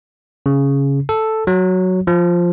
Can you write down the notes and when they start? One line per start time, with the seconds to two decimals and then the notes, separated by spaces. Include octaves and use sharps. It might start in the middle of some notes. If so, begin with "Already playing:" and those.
0.46 C#3
1.09 A4
1.47 F#3
2.07 F3